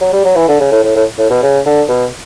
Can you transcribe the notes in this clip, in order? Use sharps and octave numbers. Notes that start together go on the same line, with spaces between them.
F#3
G3
F#3
E3
D3
C#3
A2
A2
A2
A2
B2
C#3
D3
B2